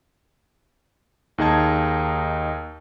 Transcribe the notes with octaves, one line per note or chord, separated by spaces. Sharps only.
D#2 D#4 G#4 D#5 A5 G#6